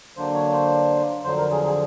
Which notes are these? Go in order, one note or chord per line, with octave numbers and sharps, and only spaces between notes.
D3 F#3 A#3 D4 C5
C#5
C5
F2 D3 F#3 C5
A#4
G#4
G#4